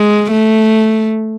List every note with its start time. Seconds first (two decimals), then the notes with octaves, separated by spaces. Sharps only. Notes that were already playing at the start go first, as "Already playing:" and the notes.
Already playing: G#3
0.31 A3